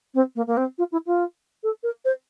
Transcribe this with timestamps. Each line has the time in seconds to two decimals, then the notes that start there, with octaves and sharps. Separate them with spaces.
0.14 C4
0.35 A#3
0.47 A#3
0.57 C4
0.78 F4
0.92 E4
1.06 F4
1.63 A4
1.83 A#4
2.04 C5